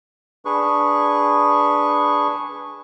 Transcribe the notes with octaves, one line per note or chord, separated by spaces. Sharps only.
D4 G#4 B4 C#6